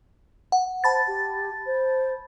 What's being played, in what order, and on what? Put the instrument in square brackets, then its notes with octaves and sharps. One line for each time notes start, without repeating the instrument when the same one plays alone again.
[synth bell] F#5
[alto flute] C5 [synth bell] A5 B5 A6
[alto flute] G4
C5